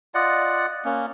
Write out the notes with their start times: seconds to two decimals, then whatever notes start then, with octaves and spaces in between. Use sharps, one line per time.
0.14 F4 D5 D#5 F#5
0.85 A#3 C#4